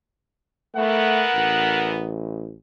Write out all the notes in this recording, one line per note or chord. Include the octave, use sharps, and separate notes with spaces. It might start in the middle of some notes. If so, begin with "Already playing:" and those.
E3 A3 B3 A#4 F#5
A1